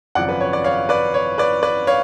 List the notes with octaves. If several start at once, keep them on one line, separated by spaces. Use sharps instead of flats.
G#1 F#2 C#3 F3 D5 F#5
B4
C#5
D5
C#5 F5
B4 D5
C#5
B4 D5
B4 D5
C#5 F5